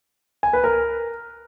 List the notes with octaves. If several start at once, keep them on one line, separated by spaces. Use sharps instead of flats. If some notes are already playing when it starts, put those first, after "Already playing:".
G#5
B4
A#4